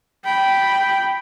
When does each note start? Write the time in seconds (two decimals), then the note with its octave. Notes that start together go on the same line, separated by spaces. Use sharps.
0.25 G5 B5